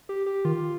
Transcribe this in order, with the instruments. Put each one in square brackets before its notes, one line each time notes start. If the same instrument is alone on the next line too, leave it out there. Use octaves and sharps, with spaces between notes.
[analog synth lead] G4
G4
[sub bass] D#3 [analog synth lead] F4